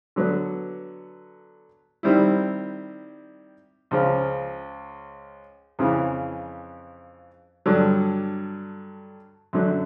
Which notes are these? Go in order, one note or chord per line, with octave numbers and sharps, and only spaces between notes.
D3 F#3 B3
D#3 G3 C4 E4
C#2 C#3 F3
F2 C#3 E3
G2 D3 F#3
F#2 D3 F#3